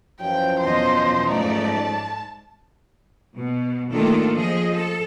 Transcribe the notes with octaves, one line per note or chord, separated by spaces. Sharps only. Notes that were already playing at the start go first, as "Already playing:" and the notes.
F#2 E3 F3 G5
E2 B2 C5 D#5
G#2 A3 D#4 D5
A5
B2
D#3 A3 A#3 D4 F4 A4
F3 G#4 D#5
A4